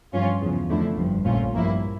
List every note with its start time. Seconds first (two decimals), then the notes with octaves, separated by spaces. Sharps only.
0.13 G2 F3 C#4 F4
0.41 E2 C#3 F3
0.69 F2 D3 F3 A3 E4
0.97 G1 G2 F3
1.25 A#1 A#2 A3 C#4 F4
1.53 G2 F3 A#3 E4